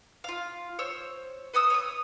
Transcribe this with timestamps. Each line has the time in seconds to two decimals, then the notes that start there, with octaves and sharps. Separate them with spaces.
0.24 F4 F5
0.79 C5 C#5 E6
1.53 B4 C#5 D#6 E6
1.70 C#5 D#6